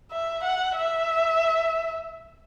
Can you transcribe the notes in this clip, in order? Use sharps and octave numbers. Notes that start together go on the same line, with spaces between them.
E5
F#5
E5